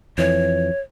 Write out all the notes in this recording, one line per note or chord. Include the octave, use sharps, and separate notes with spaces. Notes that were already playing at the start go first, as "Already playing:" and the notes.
F2 E3 C#5